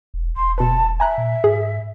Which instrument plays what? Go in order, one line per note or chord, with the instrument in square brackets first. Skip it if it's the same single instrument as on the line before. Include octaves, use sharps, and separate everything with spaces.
[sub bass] E1
[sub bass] E1 [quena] C6
[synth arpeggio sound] B2 B4 [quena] A5
[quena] E5 [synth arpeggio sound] G#5 A#5 F#6
[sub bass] A#2
[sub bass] G#2 [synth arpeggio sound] G#4